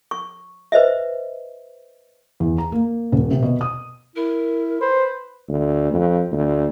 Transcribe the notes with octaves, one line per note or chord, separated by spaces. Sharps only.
C#6
B4 C5 D#5 E5
E2
A#5
A#3
D#1
C3
B2
D#6
E4 A#4
B4 C5
D2
F2
D2